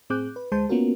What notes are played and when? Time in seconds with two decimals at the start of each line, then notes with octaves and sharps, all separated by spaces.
0.10 A2 C4 G#4 D6 F#6 G6
0.36 B4
0.52 D2 G#3 C5 A5 C6 G6
0.69 A#3 B3 C#4 F4 F#4 A#4